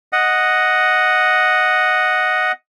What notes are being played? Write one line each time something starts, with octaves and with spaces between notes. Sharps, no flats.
D#5 F#5